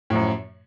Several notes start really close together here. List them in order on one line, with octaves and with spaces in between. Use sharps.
A2 F3 F#2